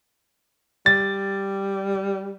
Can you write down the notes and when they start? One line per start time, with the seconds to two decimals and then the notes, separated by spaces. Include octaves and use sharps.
0.86 G3 A6